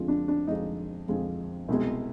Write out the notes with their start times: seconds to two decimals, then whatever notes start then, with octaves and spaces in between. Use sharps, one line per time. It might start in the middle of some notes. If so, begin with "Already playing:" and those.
Already playing: F2 D3 G#3 F4
0.08 D4
0.28 D4
0.47 F2 D3 G#3 D#4
1.08 F2 D3 G#3
1.68 C2 B2 G#3